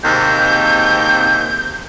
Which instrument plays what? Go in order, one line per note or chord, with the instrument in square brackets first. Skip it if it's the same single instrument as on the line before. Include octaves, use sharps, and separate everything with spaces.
[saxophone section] D#2 G#2 C3 [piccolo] G6